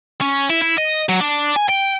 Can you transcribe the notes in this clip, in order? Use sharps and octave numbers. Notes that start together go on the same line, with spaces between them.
C#4
E4
E4
D#5
F#3
D4
G#5
G5